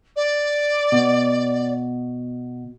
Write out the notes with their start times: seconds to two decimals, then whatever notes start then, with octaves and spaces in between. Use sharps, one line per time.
0.16 D5
0.92 B2